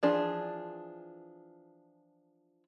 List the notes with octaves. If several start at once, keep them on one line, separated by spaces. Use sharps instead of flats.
E3 F3 D4 G#4